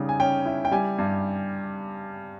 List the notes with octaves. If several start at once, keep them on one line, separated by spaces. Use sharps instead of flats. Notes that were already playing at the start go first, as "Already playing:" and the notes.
Already playing: C#3 G3 D#4
G#5
C#4 G5
E4
G5
G3 G#5
G2